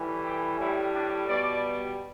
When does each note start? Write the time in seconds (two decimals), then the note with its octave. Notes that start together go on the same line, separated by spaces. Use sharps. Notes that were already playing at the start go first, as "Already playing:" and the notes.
Already playing: A2 E3 G3
0.25 G4
0.60 A2 G3 E4
0.94 D4
1.29 B2 G3 D5